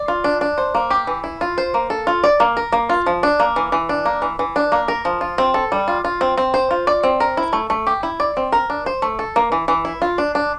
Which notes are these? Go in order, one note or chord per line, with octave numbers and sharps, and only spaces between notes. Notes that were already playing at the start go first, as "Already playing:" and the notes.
Already playing: D5
F4
D4
D4
C5
A#3
G4
E3
E4
F4
C5
A#3
A4
F4
D5
A#3
A#4
A#3
F4
F3
D4
A#3
E3
E3
D4
A#3
E3
E3
D4
A#3
A#4
F3
F4
C4
A4
G3
F4
F4
C4
C4
C5
F4
D5
C4
A#4
E4
A3
A3
G4
E4
D5
C4
A#4
D4
C5
A3
A4
A#3
E3
E3
E4
F4
D4
D4